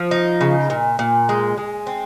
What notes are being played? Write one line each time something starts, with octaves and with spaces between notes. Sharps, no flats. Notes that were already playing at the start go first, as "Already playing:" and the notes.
Already playing: F3
D#4
C#3
A#2
A#2
G#3
G#3
C4